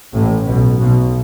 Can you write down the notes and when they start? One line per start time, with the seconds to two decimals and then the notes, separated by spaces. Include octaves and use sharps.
0.14 A1 A2
0.47 B1 B2
0.80 B1 B2